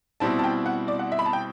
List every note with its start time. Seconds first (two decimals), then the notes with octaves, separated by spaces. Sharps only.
0.20 B2 G3 C4 E4 A5
0.39 A5
0.44 G5
0.66 F#5
0.88 D5
0.99 F#5
1.12 E5
1.19 B5
1.26 A5
1.33 G5